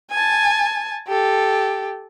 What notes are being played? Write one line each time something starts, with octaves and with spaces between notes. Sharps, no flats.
G#5 A5
G4 A4